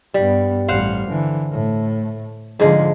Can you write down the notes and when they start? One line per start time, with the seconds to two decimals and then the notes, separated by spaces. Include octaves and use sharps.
0.14 G2 G3 B3
0.68 A1 G3 C5 F5 F#5
1.10 D3 E3
1.52 A2 A3
2.60 G#2 D3 F3 G#3